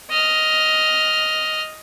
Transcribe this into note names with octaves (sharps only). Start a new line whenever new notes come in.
D#5 F6